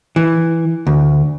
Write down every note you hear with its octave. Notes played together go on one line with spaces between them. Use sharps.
E3
D2